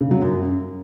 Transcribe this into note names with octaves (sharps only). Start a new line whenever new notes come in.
C#3
F#3
F#2